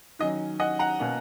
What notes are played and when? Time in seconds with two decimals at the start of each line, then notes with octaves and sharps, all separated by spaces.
0.19 D#3 F#3 C#4 D#5
0.60 D#5 F#5
0.79 F#5 A#5
0.99 B2 A#3 C#4